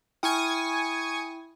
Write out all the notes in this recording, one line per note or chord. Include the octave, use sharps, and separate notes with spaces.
E4 G5 G#5 C#6 D#6